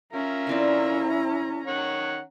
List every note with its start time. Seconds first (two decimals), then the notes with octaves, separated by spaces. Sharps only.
0.13 C#4 F4 A#4 E5 A#5
0.47 D3 C4 E4 D5
1.67 D#3 C#5 F#5